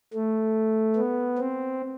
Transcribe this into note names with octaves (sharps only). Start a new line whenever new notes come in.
A3
B3
C4